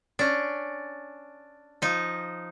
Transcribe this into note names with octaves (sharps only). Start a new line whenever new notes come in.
C#4 D4
F3 D#4